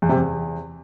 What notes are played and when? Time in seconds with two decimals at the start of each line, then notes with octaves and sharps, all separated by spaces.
0.02 E2
0.09 C3
0.16 E2